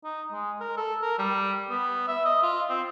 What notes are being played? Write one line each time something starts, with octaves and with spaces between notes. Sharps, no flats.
D#4
G#3
A#4
A4
A#4
G3
B3
E5
D#5
F4
C4